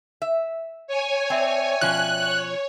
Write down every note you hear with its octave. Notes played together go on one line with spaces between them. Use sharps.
E5
C#5 G#5
C4 D5 E5 G5
B2 F3 C#4 F#6
C#5